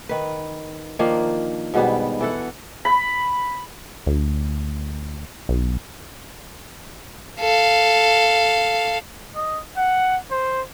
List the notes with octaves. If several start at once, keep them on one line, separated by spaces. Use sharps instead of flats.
D#3 B4
D#3 F3 A#3 D4
G#2 B2 G3 B3
E3 A4 F#5
B5
D2
B1
A4 F5
D#5
F#5
C5